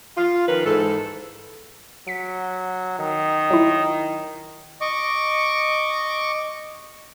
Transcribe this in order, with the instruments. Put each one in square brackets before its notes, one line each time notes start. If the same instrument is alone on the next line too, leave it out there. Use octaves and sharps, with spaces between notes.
[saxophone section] F4
D#3 F3 C#4 A#4 B4
G#2 E3 A4
[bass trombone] F#3 [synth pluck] B6 C#7
[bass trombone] D#3
[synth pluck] F#3 E4
[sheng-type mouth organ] D#5 C#6 D6